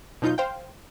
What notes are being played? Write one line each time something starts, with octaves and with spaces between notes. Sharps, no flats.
B2 F#3 D#4 F4 G6
C5 F5 G5